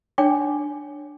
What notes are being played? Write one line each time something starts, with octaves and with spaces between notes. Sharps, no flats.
D4 C#5 G5 D6